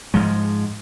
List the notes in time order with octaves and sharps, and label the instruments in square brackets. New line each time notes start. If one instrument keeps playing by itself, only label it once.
[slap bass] G#2 F3 G#3